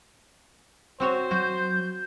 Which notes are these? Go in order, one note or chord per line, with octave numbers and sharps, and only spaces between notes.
C4 F#4 C5 C#5
F#3 F#4 G6